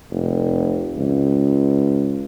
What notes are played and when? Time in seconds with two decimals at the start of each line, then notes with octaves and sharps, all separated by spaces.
0.11 F1
0.96 C#2